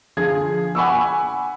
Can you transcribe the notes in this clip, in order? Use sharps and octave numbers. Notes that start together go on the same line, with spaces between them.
D3 F3 G#4 G#6
F#5 G#5 B5 C#6 D6 E6